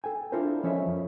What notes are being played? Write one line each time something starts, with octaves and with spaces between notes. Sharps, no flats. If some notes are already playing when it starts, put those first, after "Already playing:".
A4 G5 G#5
D4 E4 F4 A4 A#4 C5
F3 C#4 A4 C#5 D#5 E5
F2